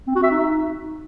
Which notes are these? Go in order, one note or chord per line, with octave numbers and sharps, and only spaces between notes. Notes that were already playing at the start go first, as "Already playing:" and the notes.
C4
F#4
E5
D#4